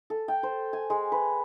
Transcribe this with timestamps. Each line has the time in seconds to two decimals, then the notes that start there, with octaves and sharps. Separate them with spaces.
0.10 A4
0.28 G5
0.43 C5
0.73 G#5
0.90 G#3
1.12 B4